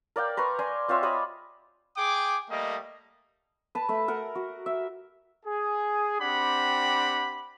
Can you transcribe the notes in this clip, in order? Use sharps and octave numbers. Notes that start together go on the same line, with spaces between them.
A#4 D5 F5 G5
B4 A#5 C6 C#6
D5 G#5 C6
C4 F4 C#5 E5
C#5 D#5 B5 D6
G#4 G5 D6
G3 A3 A#3 D#5
B4 A5
A3 B4 B5
A#4 F#5
F#4
E5
G#4
C4 D4 G4 F#5 B5